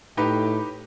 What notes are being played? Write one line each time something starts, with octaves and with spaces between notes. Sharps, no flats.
A2 D#4 G4 B4